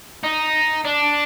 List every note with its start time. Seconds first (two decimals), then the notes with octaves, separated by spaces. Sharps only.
0.23 D#4
0.85 D4